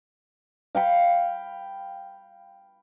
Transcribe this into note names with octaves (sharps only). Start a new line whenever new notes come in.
F5 G5 B5